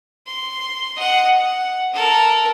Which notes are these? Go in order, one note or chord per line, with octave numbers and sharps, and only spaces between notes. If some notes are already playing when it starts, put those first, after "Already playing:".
C6
D#5 F#5
F#5
A4 A#4